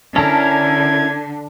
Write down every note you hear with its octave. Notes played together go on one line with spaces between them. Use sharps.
D3 C#4 E4 A#4 A5 G#6